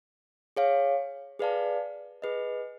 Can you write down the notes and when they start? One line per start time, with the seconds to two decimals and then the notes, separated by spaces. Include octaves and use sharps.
0.56 G#4 C#5 F5
1.39 G#4 B4 D5 F5 A5
2.22 G#4 B4 D#5